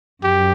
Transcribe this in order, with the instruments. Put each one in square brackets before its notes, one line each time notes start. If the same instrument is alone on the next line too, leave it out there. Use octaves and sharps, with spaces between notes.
[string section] F#2 [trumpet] G4